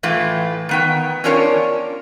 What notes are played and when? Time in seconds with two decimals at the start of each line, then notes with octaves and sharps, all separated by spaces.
0.03 A2 E3 A3 F4
0.69 D#3 B3 G5
1.24 C#4 D4 F4 A#4 C#5